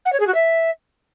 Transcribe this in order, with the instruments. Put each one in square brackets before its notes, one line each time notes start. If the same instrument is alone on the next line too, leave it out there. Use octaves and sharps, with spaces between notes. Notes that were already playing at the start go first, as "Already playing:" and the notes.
[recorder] F#5
C#5
G#4
F#4
E5